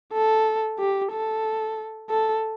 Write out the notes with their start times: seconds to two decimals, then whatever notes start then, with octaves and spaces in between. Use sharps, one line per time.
0.13 A4
0.79 G4
1.12 A4
2.10 A4